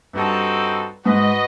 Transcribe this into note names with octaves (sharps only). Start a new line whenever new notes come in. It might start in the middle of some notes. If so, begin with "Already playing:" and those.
G2 C4 D#4 F#4 A4
G#2 F#4 B4 D#5